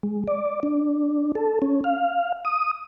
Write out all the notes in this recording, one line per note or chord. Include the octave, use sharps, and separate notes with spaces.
G#3
D5
D4
A4
C#4
F5
D#6